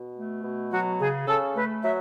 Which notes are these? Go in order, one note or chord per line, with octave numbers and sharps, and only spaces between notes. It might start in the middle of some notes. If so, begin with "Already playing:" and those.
Already playing: B2
A3
B2
F#3 F#4
C#3 G#4
C#3 A4
A3 B4
F#3 E5